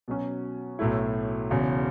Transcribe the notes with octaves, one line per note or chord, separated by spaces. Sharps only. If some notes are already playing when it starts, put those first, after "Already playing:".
B2 F#3 C#4
B1 A2 F#3 A3 E4
E1 E2 C#3